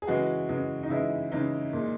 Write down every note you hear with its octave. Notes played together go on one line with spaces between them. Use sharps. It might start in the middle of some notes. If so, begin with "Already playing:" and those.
G#4
C#3 E3 G#3 F#4
C#3 E3 G#3
D#4
C#3 E3 G#3 E4
C#3 E3 G#3 D#4
A#2 G#3